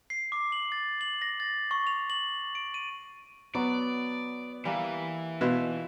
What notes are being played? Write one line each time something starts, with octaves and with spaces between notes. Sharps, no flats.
C7
D6
F#7
A6
F#7
A#6
A6
C#6
F7
F#7
D7
D#7
F#3 B3 D5
E3 G3 A#3
B2 E4 F4 C5